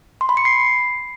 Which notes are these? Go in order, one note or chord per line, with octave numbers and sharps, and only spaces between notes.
C6
B5
C#7
C7